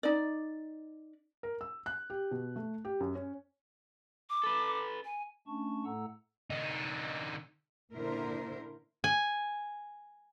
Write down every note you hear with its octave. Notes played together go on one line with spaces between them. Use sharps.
D#4 D5
A#4
E6
F#6
G4
B2
A3
G4
F#2
C#4
D6
A4 B4
G#5
A3 C#4 D4 A5 C#6
A2 A3 A4 F#5 A#5 E6
D3 D#4
A#2 D3 E4 A#4 C5
G#5